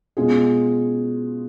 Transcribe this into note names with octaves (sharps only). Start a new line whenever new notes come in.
B2 G#3 C#4 F4 G#4